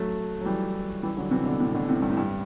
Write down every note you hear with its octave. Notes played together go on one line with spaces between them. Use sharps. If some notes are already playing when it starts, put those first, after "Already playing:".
Already playing: F#3 A3
F#3
E3 G3
E3 G3
D3 F#3
C3 E3
B2 D3
A2 C3
B2 D3
A2 C3
G2
A2
G2